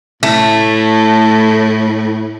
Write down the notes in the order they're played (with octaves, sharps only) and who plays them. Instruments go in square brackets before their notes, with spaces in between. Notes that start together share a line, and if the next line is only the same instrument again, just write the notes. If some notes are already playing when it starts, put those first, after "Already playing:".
[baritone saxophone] A2 [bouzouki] A3